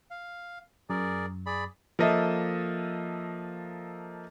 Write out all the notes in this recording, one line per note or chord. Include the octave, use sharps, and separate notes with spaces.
F5
F#2 G#4 A#4 D5
G#4 D5 B5
F3 A#3 A4 D#5 E5